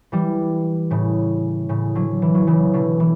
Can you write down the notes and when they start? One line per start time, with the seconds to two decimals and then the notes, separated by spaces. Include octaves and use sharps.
0.12 E3 G3
0.90 A2 C#3
1.69 A2 C#3
1.95 D3 F#3
2.22 E3
2.34 F#3
2.47 C#3 E3
2.74 B2 D3
3.00 E3